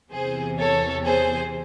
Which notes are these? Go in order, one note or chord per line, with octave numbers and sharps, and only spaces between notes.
E2 C3 E3 G#4 C5
A4 C#5
G#4 C5